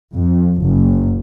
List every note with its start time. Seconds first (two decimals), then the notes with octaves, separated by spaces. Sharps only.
0.16 F2
0.64 F#1